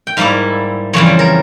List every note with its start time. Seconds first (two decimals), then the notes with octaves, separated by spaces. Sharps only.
0.07 G5
0.17 G#2 G3 A#3 E4 F5
0.93 F2 C#3 E3 G3 C#5
1.06 C5
1.19 A#4